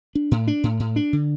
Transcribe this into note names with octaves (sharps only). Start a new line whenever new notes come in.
D4
A2
D4
A2
A2
D4
D3